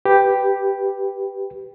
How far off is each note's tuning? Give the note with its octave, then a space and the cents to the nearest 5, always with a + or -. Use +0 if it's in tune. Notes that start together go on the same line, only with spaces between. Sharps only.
G4 +0 B4 +0